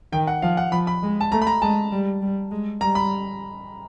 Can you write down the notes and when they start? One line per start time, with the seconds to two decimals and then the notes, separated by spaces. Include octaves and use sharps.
0.13 D#3 G5
0.27 F#5
0.42 F3 F5
0.57 F#5
0.72 F3 B5
0.87 B5
1.03 G#3
1.21 A5
1.32 A3 A#5
1.42 B5
1.47 A#5
1.62 G#3 A5
1.91 G3
2.21 G3
2.51 G#3
2.81 G3 A#5
2.95 B5